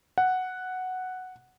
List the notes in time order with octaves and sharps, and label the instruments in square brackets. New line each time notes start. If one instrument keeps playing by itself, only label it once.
[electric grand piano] F#5